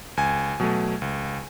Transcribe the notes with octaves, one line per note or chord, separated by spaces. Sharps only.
C#2 G#5
B2 F#3 A3
C#2